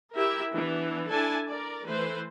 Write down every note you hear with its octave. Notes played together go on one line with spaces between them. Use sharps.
E4 G4 A#4 E5
E3 B3 D4
D4 E4 A4 G#5 A5
A#4 D5
E3 A3 B4 C5